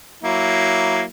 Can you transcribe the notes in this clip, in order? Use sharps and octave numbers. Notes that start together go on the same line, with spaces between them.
F#3 A#3 E4